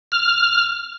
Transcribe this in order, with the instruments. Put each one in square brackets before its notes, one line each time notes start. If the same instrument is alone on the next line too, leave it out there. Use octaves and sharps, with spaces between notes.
[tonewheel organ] F6